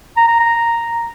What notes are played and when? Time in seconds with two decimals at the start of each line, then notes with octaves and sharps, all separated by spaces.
0.17 A#5
0.28 A#5
0.40 A#5